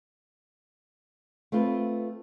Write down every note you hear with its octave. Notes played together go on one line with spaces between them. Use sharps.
A3 C4 F4 B4